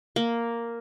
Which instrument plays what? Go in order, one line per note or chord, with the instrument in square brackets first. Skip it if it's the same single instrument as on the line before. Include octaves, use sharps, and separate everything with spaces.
[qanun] A#3